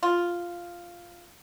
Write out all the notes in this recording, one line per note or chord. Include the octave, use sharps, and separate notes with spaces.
F4